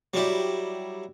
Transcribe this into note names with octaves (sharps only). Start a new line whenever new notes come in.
F#3 G3 E4